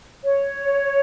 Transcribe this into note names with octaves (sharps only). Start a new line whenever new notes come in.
C#5